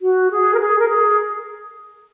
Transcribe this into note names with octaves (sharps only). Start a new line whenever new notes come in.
F#4
G#4
A#4
G#4
A#4
G#4